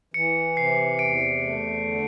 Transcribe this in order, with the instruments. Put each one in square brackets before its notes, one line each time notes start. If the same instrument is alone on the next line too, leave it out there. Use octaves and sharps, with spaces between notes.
[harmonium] E3 [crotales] C#7
[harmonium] C3 [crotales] C7
[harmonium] E2 [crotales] D7
[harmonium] A3
D3